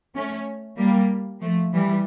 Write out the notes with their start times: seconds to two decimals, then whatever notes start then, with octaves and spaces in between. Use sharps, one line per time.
0.15 A3 C#4
0.78 G3 A#3
1.41 F3 A3
1.72 E3 G3